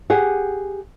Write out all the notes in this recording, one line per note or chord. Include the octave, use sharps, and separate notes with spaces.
G4 G#4 F#5